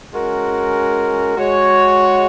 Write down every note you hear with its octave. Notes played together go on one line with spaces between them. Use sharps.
G#3 C#4 F#4 A#4
G#3 F#4 C#5